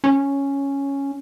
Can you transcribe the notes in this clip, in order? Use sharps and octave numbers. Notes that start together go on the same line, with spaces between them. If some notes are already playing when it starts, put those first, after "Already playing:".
C#4